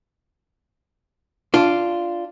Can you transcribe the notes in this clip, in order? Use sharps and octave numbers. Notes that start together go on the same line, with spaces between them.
D4 F4